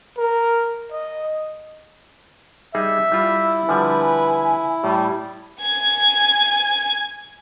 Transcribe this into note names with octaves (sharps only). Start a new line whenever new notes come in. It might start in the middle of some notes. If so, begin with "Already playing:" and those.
A#4
D#5
G3 D#4 G#4 E5
G3 E4 F4
D3 F3 G3 B4 G#5
A2 G3
G#5 G#6